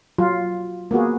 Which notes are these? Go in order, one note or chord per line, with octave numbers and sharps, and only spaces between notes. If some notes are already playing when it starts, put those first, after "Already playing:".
F#3 F4
A#3 B3 F#4 G#4